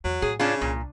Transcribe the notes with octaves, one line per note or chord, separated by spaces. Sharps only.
E2 F#3
A2 G#4
C#3 C#4 D4 F4
C2 A#2